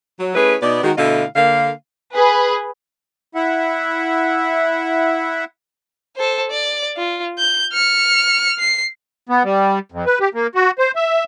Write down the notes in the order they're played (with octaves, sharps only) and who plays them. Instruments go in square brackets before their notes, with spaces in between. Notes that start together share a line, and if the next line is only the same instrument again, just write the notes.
[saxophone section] F#3
A3 C#4 E4 G#4 B4
B2 B3 D#4 D5
D#3 G#3 F#4
B2 D3 A3 E4 D#5 F5
D3 A#3 F5
[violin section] G#4 B4
[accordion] E4 E5 F#5
[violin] A4 C5
D5
F4
G6
F6 C#7
C7
[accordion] B3
G3
F2
B4
G4
A#3
F#4
C5
E5